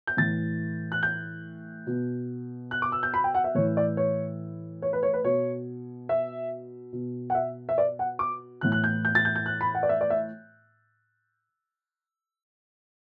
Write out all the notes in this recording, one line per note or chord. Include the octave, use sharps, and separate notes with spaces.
G6
A2 E3 A6
F#6
G6
B2
F#6
D6
E6
G6
B5
G5
F#5
E5
A2 E3 C#5
D5
C#5
C#5
B4
C#5
B4
B2 C#5
E5
B2
F#5
E5
E5
D5
F#5
D6
A2 E3 F#6
F#6
G6
G6
A6
G6
G6
F#6
B5
F#5
D5
E5
D5
E5